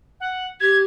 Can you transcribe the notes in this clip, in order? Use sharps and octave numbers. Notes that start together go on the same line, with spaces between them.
F#5
G4 G#6